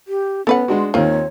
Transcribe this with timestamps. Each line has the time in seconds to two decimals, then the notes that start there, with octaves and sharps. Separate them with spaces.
0.08 G4
0.47 B3 C#4 A4 B4 F#5
0.68 G#3 D4 F#4 C6
0.94 D#2 D#3 C4 F4 C#5